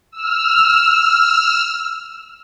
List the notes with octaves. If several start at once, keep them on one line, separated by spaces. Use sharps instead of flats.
E6 F6